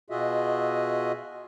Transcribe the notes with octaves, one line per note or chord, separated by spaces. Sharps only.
B2 F4 F#4 G#4 D#5 E5